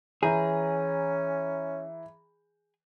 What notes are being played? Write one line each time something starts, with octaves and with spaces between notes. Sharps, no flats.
E3 C#4 G#4 A#5 G6